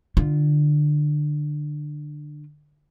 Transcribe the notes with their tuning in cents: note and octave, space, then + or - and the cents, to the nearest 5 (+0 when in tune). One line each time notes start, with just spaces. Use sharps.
D3 +20 F4 -15